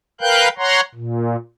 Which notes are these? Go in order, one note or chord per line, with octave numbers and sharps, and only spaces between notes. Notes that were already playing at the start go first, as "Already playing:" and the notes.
A#4 B4 F5 G5 F#6 G6
C#5 F#5 A#5 C6
A#2